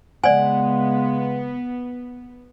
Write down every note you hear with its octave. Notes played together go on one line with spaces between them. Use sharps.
C#3 G#3 B3 D5 F#5 G#5